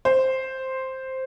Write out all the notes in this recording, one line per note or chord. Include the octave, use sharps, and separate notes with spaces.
C5